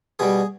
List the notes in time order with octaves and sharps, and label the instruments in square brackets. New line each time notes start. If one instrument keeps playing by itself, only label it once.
[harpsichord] B2 G3 G#4